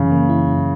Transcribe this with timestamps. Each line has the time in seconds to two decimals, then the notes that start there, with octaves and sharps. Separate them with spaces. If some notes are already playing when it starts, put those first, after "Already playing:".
Already playing: F#2 C#3 E3
0.11 A#3
0.29 E4
0.48 F#2